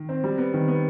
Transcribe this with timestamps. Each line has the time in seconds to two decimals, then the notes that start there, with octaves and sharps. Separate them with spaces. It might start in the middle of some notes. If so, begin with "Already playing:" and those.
Already playing: D#3
0.09 C4
0.24 G3
0.38 B3
0.54 D#3
0.68 B3